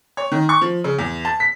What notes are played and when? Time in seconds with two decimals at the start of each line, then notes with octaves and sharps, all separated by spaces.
0.17 C#5
0.32 D#3
0.49 C#6
0.61 F3
0.84 C#3
0.99 E2
1.25 A5
1.40 B6